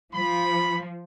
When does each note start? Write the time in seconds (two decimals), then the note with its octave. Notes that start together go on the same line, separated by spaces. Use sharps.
0.14 F3 B5